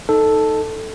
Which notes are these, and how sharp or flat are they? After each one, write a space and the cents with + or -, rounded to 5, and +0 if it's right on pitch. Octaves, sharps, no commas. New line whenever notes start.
D#4 +0 A4 +0